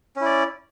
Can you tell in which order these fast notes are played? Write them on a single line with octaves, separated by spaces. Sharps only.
C#4 E4 D5